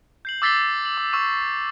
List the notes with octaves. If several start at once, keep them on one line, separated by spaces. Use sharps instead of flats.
G6 C7 F#7
D6 E6 A6 B6 C7 G7
F#7
D6
C#6 E6